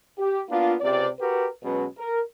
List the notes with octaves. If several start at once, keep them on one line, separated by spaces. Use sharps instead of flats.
G4
A#3 B3 D4 F4
C#2 C3 D5
F#4 G4 A#4 B4
B2 F#3 G#3 C#4 B4
A#4